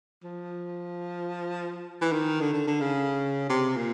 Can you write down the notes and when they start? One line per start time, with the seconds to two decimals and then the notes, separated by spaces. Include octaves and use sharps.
0.24 F3
2.01 E3
2.13 D#3
2.41 D3
2.53 D3
2.68 D3
2.81 C#3
3.49 C3
3.77 A#2